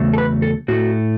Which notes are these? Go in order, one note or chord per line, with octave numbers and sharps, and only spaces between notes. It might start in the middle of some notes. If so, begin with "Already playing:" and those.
Already playing: E2 C#3 F#3 A3
A4
B4
A4
A2 A3 F#4